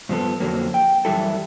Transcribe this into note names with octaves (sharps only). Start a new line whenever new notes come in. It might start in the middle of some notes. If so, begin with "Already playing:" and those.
G2 F3 B3 A4
F2 D3 F#3 A#3
G5
F#2 E3 G3 E4 A4